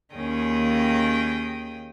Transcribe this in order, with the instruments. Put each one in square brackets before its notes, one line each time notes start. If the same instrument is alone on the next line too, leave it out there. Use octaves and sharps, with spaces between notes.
[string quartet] D#2 D#3 C#4 G#4 G5 D#6